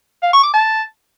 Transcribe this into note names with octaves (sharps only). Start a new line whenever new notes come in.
F5
C#6
D6
A5